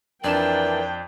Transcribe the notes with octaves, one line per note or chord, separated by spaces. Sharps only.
F2 E3 D4 A#4 D5 G5 E7